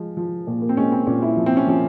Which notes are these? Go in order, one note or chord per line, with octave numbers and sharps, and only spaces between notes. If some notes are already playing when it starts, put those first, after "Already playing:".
Already playing: F3 G#3
F3
A#2
A#3
C4
G#3 C#4
C4
A#2 C#4
E4
F3
C4
C#4
F3 C#4